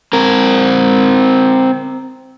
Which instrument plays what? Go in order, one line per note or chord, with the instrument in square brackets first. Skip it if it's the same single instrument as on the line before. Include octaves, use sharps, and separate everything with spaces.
[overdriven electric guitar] C4 A#4